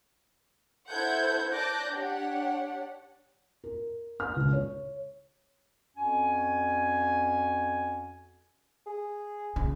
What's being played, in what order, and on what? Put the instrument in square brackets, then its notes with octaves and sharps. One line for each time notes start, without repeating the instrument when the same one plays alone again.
[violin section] E4 A4 C5 F#5 G6 G#6
D5 A5 D6 F#6 G6 A#6
D4 G4 C#5 F#5
[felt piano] A#4
F6
C#2
C#5
[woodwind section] F2 C#4 F#4 G#5
[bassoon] G#4
[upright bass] C#3